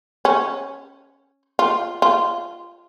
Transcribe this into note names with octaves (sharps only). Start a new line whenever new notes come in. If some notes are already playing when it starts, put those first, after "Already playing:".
C#4
F4
F4